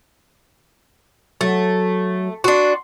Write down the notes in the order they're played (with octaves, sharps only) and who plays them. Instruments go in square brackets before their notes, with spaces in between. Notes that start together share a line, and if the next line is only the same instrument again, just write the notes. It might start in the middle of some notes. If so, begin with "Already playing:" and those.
[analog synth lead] F#3 [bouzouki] A3
[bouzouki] D4 F#4 [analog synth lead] C6